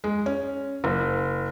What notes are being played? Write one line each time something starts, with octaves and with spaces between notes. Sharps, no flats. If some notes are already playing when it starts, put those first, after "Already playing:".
G#3
C#4
F#1